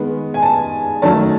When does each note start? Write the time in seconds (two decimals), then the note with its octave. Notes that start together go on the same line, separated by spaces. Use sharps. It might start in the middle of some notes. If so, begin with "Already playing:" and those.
Already playing: D#3 G#3 B3
0.34 G#5
0.43 A5
1.02 D#3 F#3 A3 C#4 A5